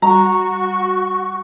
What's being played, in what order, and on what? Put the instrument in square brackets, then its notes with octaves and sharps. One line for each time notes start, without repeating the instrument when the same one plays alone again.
[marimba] G3 [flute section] F#4 C#6 [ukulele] A#5